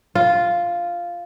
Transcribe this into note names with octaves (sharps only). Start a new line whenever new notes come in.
F4